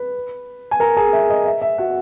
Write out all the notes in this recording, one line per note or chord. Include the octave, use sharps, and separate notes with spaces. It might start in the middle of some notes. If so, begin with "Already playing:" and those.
Already playing: B4
G#5
A#4 A#5
G#4 G#5
E5
D#5
E5
E5
F#4 F#5